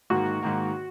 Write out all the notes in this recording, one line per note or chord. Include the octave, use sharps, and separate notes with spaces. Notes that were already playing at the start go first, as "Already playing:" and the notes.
G#2 D#3 A#3 F#4
G#2 D#3 A#3